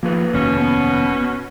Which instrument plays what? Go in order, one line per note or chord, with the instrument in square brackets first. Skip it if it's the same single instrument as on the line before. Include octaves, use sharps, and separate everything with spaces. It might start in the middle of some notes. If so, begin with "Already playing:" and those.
[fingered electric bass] F3 [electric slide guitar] A#3 G#4 B4
[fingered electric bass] F1 D#2 [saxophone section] B2 C#4
[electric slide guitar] B3